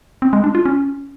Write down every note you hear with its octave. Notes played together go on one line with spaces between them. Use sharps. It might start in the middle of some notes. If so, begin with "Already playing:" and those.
C4
G#3
D4
F4
C#4